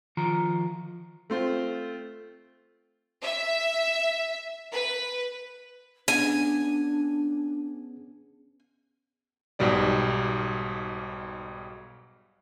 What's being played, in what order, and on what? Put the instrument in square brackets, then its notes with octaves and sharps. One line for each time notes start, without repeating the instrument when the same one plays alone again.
[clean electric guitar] D#3 F3 F4 A#5
[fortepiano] A3 C4 F4
[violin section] E5
B4
[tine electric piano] B3 C#4 G#4 [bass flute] D4 [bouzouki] G#5
[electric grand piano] B1 G#2 B2 G3 D5